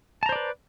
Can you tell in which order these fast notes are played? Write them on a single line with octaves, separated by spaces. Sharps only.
A5 A#5 C5 D5 B4